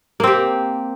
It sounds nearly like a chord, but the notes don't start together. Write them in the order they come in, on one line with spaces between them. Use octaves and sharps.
A#3 C4 G4